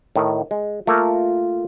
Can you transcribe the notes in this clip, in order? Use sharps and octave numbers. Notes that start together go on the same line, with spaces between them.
A2 D#3
G#3
A3 A#3 F4 A#4